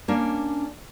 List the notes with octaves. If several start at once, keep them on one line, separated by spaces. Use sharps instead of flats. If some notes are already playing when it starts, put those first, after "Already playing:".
A#3 C#4 D4